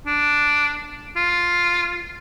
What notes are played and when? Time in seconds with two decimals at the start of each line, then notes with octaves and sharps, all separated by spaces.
0.07 D4
1.16 F4